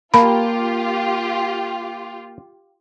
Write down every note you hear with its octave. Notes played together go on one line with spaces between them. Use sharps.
A#3 F4 G4 A5 B5